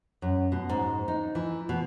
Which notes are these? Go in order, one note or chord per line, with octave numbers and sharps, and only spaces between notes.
F#2
B2
G#2
D#4
E3
B2